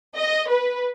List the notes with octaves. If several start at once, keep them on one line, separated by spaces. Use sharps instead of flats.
D#5
B4